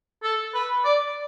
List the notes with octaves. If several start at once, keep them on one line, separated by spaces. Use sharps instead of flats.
A4
B4
D5